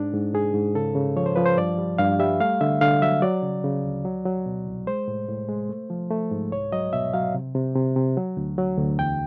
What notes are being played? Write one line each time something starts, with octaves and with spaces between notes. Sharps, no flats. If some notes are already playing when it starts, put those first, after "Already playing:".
Already playing: G#2 D4
G#2
G#2 G#4
G#2
C#3 A4
C#3
F3 C#5
C5
F3 B4
C5
G2 D5
G3
G2 F5
G3 E5
A3 F5
D3 E5
D3 F5
F#3 E5
F#3 D5
C#3
C#3
D2
F#3
F#3
B2
C2
G#3 C5
A2
A2
G#3
A3
F3
A3
G#2
C2 C#5
F#3 D#5
B2 E5
F#3 F5
C3
C3
C3
C3
F#3
D2
F#3
D2
E2 G5